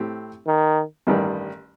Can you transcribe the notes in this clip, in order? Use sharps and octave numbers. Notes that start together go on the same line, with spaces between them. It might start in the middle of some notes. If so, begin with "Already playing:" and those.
Already playing: A2 A3 C4 G4
D#3
A1 G2 D#3 G3